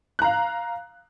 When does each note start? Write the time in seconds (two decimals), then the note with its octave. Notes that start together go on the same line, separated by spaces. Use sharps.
0.19 F#6
0.22 A#5
0.24 F5